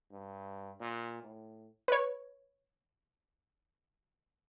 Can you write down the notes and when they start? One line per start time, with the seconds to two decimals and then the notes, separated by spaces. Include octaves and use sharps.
0.12 G2
0.80 A#2
1.23 A2
1.88 B4 C#5